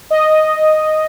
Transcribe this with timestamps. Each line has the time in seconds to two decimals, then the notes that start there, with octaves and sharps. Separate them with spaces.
0.10 D#5